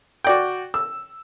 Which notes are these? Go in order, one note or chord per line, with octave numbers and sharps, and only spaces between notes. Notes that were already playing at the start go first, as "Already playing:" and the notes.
F#4 D5 G5
E6